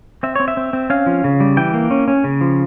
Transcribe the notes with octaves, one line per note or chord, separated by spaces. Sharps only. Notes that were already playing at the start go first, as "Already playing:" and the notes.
C4 E5
C4 C#5
E5
C4
C4
C#4 F5
F3
C#3
G3
E3 G5
A#3
C#4
C#4
C#3
F3